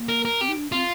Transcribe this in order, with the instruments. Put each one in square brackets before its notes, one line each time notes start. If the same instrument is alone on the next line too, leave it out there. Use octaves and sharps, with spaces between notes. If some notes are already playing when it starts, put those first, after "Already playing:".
Already playing: [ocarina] A#3
[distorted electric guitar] A#4
A#4
[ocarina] C4 [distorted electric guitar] G4
[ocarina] D#4
D4
[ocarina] C4 [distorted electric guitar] F4